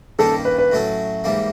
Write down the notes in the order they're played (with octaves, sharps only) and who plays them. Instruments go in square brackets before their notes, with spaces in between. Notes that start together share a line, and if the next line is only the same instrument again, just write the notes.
[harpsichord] G2 D#3 G3 A#3 C#4 [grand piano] A4
[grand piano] B4
B4
[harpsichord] A2 F#3 A3 C#4
G#2 E3 G3 A#3